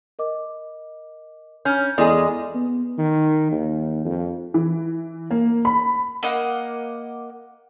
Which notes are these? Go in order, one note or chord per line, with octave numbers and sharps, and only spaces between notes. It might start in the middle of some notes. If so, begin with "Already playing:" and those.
A#4 D#5 D6
C#4 F6 G6
E2 G#3 G#4 A4 D5 D#5
B3
D#3
D#2
F2
E3
A#3
B5
A#3 D#5 F#5